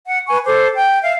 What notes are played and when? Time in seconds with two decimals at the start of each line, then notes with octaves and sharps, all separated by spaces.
0.05 F#5
0.28 B4 G#5 C#6
0.45 A4 C5 D6
0.75 G5
1.02 E5 F5